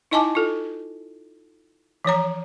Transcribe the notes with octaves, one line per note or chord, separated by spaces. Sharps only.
D#4 E4 D#5 G#5 A5 D6
F4 A4
E3 F3 C#5 A#5